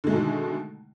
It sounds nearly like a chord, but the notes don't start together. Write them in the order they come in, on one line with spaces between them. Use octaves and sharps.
D3 G#3 A3 B2 D#3